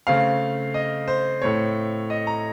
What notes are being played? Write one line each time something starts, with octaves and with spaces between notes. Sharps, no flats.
C#3 A3 C4 F5
D#5
C5
A2 A3 C4 C#5
D#5
A#5